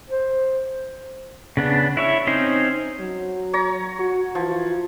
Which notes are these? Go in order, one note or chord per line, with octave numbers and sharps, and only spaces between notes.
C5
C#3 B3 D4
E4 C#5 E5
C4 C#4 D#4 C5
F#3
C#5 A#5
F#4
E3 F3